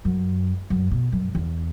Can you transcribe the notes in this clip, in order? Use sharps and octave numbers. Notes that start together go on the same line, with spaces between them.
F#2
F#2
B2
F#2
E2